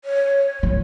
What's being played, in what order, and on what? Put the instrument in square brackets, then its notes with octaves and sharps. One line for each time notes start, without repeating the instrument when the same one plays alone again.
[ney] C#5
[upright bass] F3